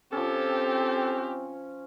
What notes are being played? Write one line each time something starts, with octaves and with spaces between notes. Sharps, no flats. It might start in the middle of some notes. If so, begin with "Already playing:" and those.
F3 C4 C#4 G4 A4